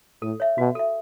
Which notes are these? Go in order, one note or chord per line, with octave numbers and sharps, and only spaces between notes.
A2 A4
C#5 E5
B2 F#4
A4 E5